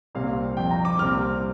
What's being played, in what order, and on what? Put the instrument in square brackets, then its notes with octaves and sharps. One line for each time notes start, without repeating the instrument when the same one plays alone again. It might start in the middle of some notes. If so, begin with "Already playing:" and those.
[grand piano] C2 A#2 G3 C4 F5
F2 F3 C4 G5
A#5
D6
C2 A#2 G3 C4 F6